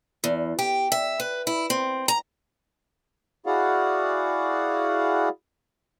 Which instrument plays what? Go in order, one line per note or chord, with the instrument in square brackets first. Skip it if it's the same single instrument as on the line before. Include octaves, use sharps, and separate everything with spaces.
[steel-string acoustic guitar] E2
G4
E5
B4
E4
C4
A#5
[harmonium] E4 F#4 G#4 D5 F5 F#5